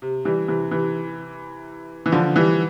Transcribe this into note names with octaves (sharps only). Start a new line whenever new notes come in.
C3
E3 G3
C3 E3
C3 E3
E3
D3 F3
E3 G3